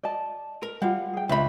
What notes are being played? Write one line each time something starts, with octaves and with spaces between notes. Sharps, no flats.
D5 D#5 A5
A#4
G3 F4 F#5
G#4 G5
C#2 D4 E5 B5